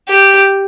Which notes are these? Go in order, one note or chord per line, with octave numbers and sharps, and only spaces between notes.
G4